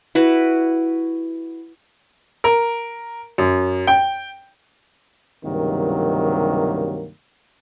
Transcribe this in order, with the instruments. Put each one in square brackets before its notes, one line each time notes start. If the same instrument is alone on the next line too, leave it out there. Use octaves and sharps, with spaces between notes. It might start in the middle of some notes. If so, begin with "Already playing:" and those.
[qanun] E4 F#4 B4
[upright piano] A#4
F#2
G5
[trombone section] C#2 G2 C3 D#3 F#3 A#3